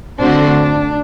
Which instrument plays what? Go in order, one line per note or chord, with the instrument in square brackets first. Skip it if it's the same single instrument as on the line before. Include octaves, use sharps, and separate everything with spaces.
[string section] D3 A3 C4 F#4 C5 [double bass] D4